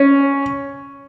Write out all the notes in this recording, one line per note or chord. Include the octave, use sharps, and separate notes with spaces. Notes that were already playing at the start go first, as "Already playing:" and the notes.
Already playing: C#4